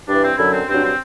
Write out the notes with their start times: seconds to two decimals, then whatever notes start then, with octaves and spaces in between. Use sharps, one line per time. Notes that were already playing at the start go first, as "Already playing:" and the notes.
0.06 G2 E3 D4
0.22 C4
0.37 F#2 D3 F#3 E4
0.51 C4
0.67 G2 F#3 C4
0.77 D4
0.83 C4